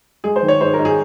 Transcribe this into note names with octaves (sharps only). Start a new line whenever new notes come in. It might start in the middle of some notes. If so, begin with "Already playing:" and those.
G#3 G#4
C5
D#3
C#5
G#2 C5
A#4
G#2
G#4